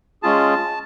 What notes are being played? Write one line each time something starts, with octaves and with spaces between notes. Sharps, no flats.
G#3 C#4 F4 G#4 A5